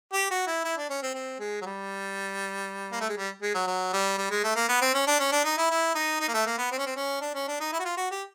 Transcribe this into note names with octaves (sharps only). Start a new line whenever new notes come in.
G4
F#4
E4
E4
D4
C#4
C4
C4
G#3
F#3
G3
A#3
A3
G#3
G3
G#3
F#3
F#3
G3
G3
G#3
A3
A#3
B3
C4
C#4
D4
C#4
D4
D#4
E4
E4
D#4
D#4
A#3
A3
A#3
B3
C4
C#4
C4
C#4
D4
C#4
D4
D#4
E4
F#4
F4
F#4
G4